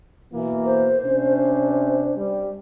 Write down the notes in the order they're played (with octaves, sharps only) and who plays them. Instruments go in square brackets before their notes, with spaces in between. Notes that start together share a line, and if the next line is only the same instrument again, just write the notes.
[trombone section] B2 E3 A#3
[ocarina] C5
[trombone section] C3 C#4 D4
G3